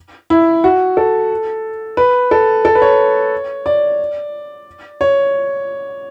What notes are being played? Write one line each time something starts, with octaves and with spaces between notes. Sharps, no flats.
E4
F#4
A4
B4
A4
A4
B4
C#5
D5
C#5